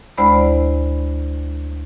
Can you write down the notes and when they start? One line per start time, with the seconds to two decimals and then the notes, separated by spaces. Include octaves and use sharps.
0.18 D2 G#3 E4 C5 D5 B5